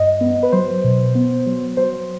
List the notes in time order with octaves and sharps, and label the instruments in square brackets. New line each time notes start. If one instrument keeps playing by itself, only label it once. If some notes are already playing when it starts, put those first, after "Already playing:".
Already playing: [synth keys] G2 D#5
B3
B4
F#3 C5
B2
B3
F#3
F#3 C5